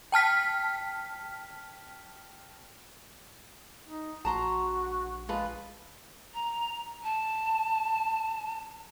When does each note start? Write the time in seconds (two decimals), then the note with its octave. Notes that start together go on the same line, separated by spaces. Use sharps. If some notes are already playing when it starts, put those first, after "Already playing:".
0.12 G5 A5 F6 B6
3.87 D#4
4.25 A#1 F#4 A5 A#5 C6
5.29 G#3 F4 B4 A5
6.34 A#5
7.03 A5